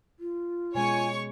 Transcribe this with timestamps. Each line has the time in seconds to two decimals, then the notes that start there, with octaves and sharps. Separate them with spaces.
0.20 F4
0.75 B2 G#3 C#4 C#5 G#5 C#6